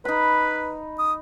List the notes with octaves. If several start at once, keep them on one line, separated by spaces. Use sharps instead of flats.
D#4 B4 B5
D#6